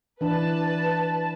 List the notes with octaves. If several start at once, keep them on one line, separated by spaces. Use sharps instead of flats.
E3 D4 B4 A5